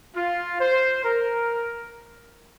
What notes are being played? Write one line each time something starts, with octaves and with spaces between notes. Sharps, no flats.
F4
C5
A#4